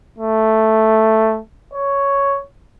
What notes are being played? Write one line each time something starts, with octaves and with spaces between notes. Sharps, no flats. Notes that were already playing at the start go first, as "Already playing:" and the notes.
A3
C#5